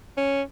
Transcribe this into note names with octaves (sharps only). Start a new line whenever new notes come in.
C#4